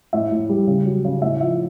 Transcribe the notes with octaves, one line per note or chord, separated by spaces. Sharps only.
A2 E5
A2
G3
C#3
F#3
C#3
A2 E5
F3 E5